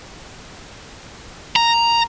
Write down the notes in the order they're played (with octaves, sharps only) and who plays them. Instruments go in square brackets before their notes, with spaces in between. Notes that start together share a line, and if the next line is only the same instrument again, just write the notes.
[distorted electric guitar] A#5